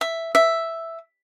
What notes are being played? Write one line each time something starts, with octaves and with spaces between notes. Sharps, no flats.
E5
E5